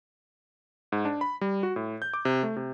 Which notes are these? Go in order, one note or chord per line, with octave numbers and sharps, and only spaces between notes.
G#2
D4
B5
G3
F#4
A2
G6
D6
C3
A3
C3